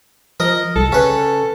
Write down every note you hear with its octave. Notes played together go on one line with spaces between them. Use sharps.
F3 A#4 D#5
C2 A4
C#3 C#4 B4